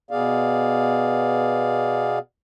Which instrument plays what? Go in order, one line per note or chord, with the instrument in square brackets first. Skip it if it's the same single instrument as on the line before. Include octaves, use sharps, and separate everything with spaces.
[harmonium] B2 B3 G#4 D5 F5